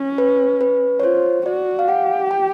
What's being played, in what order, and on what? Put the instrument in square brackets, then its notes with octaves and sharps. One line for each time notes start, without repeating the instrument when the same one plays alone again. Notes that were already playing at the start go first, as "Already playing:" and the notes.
Already playing: [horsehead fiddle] C#4
[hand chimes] B4
B4
C#5
[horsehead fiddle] F4 [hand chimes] C5
[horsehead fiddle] F#4 [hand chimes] D5
[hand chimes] F5
[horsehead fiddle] G4 [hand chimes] F#5
[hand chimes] G5